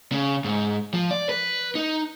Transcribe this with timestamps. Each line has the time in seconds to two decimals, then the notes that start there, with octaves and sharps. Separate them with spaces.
0.12 C#3
0.44 G#2
0.94 F3
1.11 D5
1.29 B4
1.75 D#4